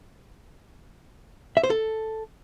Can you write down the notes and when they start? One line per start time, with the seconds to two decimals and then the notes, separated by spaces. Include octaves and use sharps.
1.57 E5
1.63 C5
1.70 A4